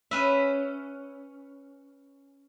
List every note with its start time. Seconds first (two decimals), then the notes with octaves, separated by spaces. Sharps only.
0.11 C#4 B4 E5